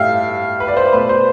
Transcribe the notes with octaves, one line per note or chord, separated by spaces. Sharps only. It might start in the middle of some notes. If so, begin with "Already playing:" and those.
Already playing: A2 G3 E5 F5 G5
B4
D5
C5
B2 A3 B4
C5